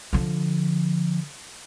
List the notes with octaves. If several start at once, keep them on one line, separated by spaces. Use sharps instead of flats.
D3 F3